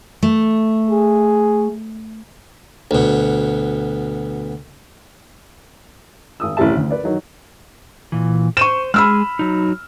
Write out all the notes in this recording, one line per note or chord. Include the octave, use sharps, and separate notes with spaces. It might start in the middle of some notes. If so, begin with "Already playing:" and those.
A3
G#4
D2 B2
G#1 D#6 E6
A1 E2 A2 C3 E5 A5
D2
B4 D5
D#3 F#3 D#4
A#2 E3
C5 C#6 D#7 E7
G#3 G#4 B5 E6 F6
F#3 D#4